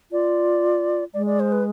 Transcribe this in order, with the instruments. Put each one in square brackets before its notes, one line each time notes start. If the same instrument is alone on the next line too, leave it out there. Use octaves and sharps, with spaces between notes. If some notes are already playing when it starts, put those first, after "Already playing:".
[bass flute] F4 [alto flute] D5
[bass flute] G#3 [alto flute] D5
[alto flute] D5
C5
B4